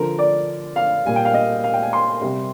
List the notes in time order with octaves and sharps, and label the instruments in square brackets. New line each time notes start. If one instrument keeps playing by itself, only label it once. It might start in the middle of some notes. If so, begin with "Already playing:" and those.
Already playing: [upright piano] D3 F3 A#4
D5
F5
A#2 G3 G#5
G5
F5
D#5
F5
G5
G#5
C6
C3 G3